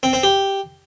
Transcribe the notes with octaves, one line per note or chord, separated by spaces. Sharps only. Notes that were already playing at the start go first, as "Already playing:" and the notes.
C4
C4
G4